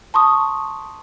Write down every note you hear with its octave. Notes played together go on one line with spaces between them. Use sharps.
A5 C6 C#6 D#6